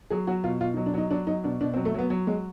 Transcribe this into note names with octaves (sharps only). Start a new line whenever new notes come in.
F#3 G#4
F#3 F#4
B2 F4
B2 F4
D#4
F#3
D4
F#3 D#4
F#3 D4
F#3 D#4
B2 D4
B2 D4
C4
F#3
A3
F#3 B3
F#3
F#3 G#3